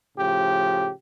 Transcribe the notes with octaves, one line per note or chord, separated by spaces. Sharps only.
A2 C#3 F3 G4